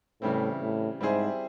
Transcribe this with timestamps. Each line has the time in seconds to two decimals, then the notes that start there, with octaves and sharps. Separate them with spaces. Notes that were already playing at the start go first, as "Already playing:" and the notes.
0.22 A2 C#3 E3 G3 C4 E4
0.61 A2
1.01 G#2 G3 C4 E4 G#4 C5